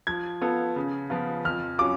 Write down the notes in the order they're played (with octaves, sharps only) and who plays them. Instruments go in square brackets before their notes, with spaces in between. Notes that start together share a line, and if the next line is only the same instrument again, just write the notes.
[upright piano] F3 [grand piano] G#6
[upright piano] B3 F4 A4
C#3
F3 B3 F4
[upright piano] F2 [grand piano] F6
[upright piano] F#3 C#4 F4 [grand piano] D6